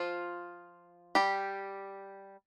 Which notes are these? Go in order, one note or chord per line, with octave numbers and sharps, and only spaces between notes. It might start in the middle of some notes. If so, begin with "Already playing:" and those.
Already playing: F3 F4
G3 G4